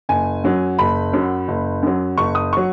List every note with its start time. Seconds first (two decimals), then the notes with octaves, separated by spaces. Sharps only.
0.09 F#1 G#5
0.44 F#2 F#3
0.79 F#1 B5
1.13 F#2 F#3
1.48 F#1
1.83 F#2 F#3
2.17 F#1 C#6
2.35 D#6
2.53 F#3 C#6